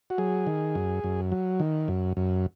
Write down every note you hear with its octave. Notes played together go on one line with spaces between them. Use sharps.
F#4
F#3 G#4
D#3
F#2
F#2
F#3
D#3
F#2
F#2